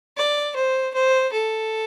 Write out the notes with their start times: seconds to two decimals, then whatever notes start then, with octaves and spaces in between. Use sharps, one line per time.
0.17 D5
0.56 C5
0.94 C5
1.32 A4